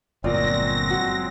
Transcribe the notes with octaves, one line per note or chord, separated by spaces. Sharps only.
G1 A#2 F#3 G#3 C4 F4 D5 A#6
F#4